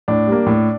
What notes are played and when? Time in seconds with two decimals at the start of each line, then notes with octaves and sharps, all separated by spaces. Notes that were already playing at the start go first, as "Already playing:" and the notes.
0.08 A2 D4
0.27 G3 A#3
0.46 A2